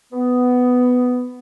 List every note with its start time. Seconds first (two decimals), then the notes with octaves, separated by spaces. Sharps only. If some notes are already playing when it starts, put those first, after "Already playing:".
0.12 B3